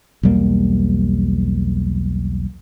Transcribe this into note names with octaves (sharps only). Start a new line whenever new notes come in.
B1 E2 G3 A#3